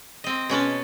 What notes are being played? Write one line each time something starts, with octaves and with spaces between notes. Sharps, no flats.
C4 D#5
B2 C#4 B4 A5